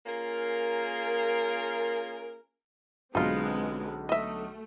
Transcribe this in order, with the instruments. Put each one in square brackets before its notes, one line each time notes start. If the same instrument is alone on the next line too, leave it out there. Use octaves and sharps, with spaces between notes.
[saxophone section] A#3 C#4 F4 G#4 A#4
[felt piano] B1 D3 [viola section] G#3 B3 C4 [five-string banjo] D#4 F4
[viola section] A3 [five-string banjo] D#5 E5